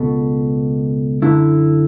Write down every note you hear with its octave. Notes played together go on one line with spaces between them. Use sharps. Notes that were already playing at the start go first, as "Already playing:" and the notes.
Already playing: C#2 B2 A3
F#2 D3 A3 E4